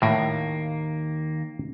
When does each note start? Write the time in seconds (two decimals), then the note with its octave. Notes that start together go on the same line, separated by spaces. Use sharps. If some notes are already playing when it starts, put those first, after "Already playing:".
0.02 D#2 A2 A#3